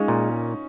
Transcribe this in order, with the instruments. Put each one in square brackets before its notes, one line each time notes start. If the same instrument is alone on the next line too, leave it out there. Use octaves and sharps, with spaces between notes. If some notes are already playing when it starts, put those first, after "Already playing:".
Already playing: [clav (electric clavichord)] G#3 [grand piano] C#4 D#4 F4
[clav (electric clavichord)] A#2